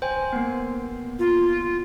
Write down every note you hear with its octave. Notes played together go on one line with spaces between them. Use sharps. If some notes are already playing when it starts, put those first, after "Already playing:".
C5 G5 G#5
A#3 B3
F4